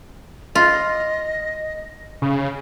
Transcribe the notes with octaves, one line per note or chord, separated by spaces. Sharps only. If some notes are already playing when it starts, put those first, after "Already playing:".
F4 D#5
C#3